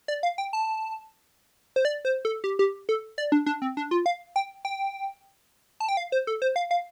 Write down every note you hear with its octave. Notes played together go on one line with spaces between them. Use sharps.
D5
F5
G5
A5
C5
D5
C5
A4
G4
G4
A4
D5
D4
D4
C4
D4
F4
F5
G5
G5
A5
G5
F5
C5
A4
C5
F5
F5